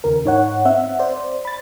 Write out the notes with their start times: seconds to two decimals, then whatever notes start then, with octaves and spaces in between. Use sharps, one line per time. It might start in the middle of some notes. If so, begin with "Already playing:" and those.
0.04 D#2 C#3 A#4
0.24 G#2 D#4 C#5 F#5
0.65 C4 E5 F#5
0.99 C5 D5
1.45 B5 A6